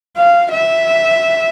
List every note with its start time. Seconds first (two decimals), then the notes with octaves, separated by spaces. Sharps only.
0.17 F5
0.51 E5